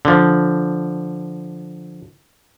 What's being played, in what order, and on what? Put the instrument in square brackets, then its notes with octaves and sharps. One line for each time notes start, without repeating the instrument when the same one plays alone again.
[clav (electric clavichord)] D3 F3